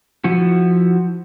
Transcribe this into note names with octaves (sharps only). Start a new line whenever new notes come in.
F3 E4 F#4